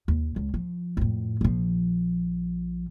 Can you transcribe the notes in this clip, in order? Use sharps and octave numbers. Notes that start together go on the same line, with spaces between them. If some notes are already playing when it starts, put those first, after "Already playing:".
D#2
C#2
F3
F2 A2
A#1 F3